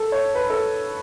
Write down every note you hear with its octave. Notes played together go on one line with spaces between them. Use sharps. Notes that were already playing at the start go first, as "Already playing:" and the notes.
Already playing: A4
C#5
B4
A4